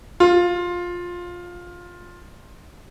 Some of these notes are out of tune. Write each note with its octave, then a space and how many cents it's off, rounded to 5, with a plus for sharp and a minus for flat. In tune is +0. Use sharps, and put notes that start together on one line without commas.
F4 +10